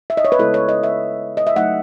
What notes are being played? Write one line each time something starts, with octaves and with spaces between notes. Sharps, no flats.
E5
D#5
C#5
B4
C#3 G#3 B3 E4 A4
C#5
D#5
E5
D#5
E5
F#3 A3 D#4 F#5